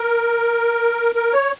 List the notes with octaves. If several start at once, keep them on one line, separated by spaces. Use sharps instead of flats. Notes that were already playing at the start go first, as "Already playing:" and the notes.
Already playing: A#4
A#4
C#5